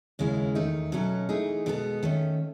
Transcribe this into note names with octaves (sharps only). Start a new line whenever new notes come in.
D#2 C#3 G#3 C#4 E4
E2 D#3 A3 D#4
B2 F#3 A3 C#4
E3 A3 D#4 G#4
B2 G#3 B3 F#4 A4
D#3 A3 C#4